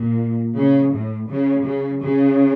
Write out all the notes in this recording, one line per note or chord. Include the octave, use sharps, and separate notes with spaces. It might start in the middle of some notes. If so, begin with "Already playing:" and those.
Already playing: A#2
C#3
A2
C#3
C#3
C#3